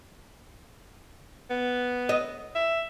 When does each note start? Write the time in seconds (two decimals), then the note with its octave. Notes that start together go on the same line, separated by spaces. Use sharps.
1.50 B3
2.09 D#5
2.55 E5